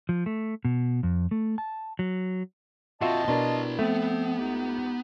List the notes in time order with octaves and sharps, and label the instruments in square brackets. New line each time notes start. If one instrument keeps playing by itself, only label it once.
[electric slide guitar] F3
A3
B2
F2
A3
A5
F#3
[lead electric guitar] A#2 C4 [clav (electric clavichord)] F4 F#4 E5 [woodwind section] D#5 A5
[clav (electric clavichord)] B2 D4 A#4 [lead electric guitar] E4 C6
[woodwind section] F3 C4 [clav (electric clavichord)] A3 [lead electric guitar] B3
[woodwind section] C#2 D#4 G4